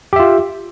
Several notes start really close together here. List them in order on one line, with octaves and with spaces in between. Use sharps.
G4 E5 F4